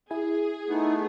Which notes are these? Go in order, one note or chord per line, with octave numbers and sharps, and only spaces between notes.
E4 G#4 G#5
A3 B3 D#4